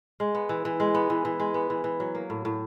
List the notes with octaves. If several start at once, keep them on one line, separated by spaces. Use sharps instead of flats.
G#3
B3
E3
E3
G#3
B3
E3
E3
G#3
B3
E3
E3
F#3
A#3
A2
A2